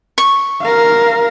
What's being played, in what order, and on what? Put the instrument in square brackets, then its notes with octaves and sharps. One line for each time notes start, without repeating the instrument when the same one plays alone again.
[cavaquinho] C#6
[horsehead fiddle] A#4 F5